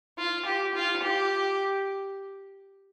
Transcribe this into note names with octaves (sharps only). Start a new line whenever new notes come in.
F4
G4
F4
G4